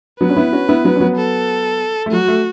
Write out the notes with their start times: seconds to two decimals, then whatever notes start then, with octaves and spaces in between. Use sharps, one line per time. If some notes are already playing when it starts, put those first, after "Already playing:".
0.21 F#3 B3 B4
0.30 C#4
0.36 B3 E4
0.52 C#4 F#4
0.69 B3 E4
0.84 F#3 B3
0.96 C#4
1.00 F#3 B3
1.16 A4
2.06 A3
2.12 F#3 F#4
2.28 A3